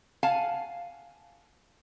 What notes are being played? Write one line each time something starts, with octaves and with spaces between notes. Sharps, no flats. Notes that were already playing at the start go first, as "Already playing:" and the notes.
F5 F#5 G#5 A5